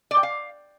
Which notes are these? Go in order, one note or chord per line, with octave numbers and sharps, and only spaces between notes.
D5
G5
F5